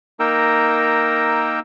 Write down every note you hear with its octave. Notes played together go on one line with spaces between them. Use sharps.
A#3 D#4 A#4 G5 A#5 E6